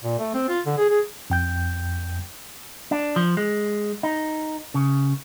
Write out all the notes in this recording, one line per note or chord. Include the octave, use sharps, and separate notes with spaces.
A#2
A3
C4
F4
D3
G#4
G#4
F2 G5 G6
D4
F3
G#3
D#4
C#3